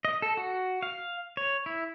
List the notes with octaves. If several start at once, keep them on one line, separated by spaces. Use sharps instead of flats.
D#5
A4
F#4
F5
C#5
E4